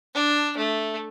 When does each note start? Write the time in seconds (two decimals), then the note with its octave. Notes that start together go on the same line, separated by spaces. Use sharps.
0.15 D4
0.58 A3